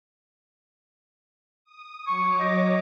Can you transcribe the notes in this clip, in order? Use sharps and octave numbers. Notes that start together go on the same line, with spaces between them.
D#6
F#3 C#5 C#6 D6
D#5